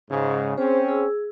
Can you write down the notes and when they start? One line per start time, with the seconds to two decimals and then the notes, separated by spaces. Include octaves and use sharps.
0.11 G#2 C#3
0.57 C4 C#4 G#4 C5
0.89 G#4 E6